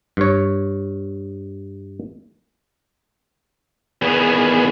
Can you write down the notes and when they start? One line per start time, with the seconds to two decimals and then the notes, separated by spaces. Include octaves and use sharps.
0.17 G2 C#5
4.02 E2 D#3 B3 G#4